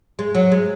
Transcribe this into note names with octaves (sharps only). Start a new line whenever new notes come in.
G#3
F#3
G#3